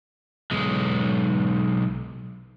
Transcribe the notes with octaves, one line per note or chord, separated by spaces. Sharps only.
B1 G#3